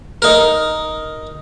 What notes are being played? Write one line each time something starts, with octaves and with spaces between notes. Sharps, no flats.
D#4 A#4